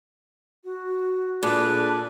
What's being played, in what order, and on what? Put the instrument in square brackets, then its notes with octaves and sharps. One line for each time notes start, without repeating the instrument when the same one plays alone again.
[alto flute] F#4
[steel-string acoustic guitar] A#2 [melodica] D4 B4 D5 [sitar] G#4 [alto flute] A4